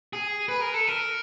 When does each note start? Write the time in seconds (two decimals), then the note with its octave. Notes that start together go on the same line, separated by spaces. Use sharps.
0.13 G#4
0.49 B4
0.61 A#4
0.74 A4
0.87 A#4